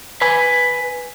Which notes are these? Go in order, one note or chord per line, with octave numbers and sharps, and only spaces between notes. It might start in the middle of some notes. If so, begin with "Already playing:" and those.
B4 G#5